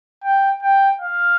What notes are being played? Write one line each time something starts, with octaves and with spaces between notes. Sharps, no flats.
G5
G5
F5